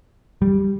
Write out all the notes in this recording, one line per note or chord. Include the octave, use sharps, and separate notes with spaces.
G3